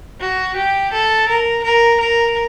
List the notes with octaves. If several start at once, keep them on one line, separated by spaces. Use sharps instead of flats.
F#4
G4
A4
A#4
A#4
A#4